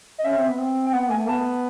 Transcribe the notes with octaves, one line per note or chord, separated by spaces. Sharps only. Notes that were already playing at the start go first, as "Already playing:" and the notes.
D#5
C#4 E5
C4
B3
C4
G5
B3 F#5
A3 G#5
B3 A5